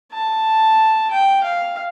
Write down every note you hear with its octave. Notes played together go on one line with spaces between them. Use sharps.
A5
G5
F5